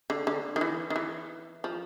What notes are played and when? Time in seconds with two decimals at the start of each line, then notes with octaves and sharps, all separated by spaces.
0.10 D3
0.27 D3
0.56 D#3
0.61 E3
0.90 D#3
0.96 E3
1.64 F3